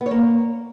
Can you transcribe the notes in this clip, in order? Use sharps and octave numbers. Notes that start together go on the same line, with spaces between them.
B3
C#5
A#3